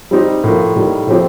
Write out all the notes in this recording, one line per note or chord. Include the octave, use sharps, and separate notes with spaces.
G3 C4 D#4 G4
A2 F3 A#3
A2 G3 A#3 D#4
A2 F3 C4 G4